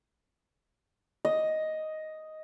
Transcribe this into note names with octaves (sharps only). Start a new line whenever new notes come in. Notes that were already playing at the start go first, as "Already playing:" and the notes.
D#5